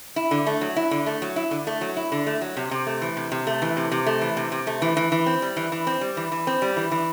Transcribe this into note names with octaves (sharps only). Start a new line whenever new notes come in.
E4
D3
A3
F#3
E4
D3
A3
F#3
E4
D3
A3
F#3
E4
D3
A3
F#3
C3
C3
A3
E3
C3
C3
A3
E3
C3
C3
A3
E3
C3
C3
A3
E3
E3
E3
C4
G3
E3
E3
C4
G3
E3
E3
C4
G3
E3
E3